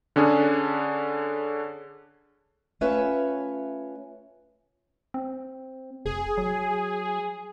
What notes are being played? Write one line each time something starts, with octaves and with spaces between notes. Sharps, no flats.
D3 C#4 D4 G#4
A3 C#4 F4 B4 C#5 E5
C4
F1 G#4
F#3